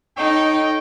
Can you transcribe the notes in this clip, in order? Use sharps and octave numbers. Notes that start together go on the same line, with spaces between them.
D#4 A4 C#5 G5